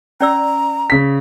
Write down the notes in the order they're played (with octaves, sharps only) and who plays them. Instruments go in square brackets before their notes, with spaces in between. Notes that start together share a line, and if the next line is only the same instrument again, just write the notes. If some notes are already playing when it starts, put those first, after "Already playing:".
[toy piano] C#4 D5 E6 [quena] A#5
[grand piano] C#3 B6